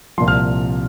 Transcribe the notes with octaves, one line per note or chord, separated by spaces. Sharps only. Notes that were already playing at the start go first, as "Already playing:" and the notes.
C2 A#2 F3 C6
F6